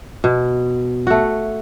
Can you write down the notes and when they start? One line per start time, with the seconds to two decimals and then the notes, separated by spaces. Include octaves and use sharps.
0.24 B2
1.07 A3 F#4